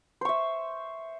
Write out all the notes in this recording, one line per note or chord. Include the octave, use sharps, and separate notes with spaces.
C5 E5 C#6